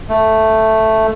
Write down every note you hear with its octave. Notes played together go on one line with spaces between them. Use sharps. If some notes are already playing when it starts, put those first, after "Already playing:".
A3